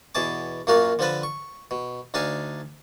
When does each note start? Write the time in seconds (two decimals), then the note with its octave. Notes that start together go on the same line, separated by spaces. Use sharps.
0.15 E2 B2 G#4 A5 D6
0.67 F#2 A#2 A#3 F4 F#4 F5
0.99 D3 F3 C4 A4 B4
1.23 C#6
1.71 B2
2.14 D2 D4 D#4 F5 G#5